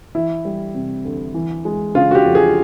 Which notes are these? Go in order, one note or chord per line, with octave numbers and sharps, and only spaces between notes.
E3 E4
G3
C3
D2
E3
G#3
C#3 F4
F#4
G4
F2
G#4